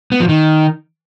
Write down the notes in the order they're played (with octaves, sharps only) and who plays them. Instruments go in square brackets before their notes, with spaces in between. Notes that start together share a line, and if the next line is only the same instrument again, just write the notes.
[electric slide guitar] B3
F3
D#3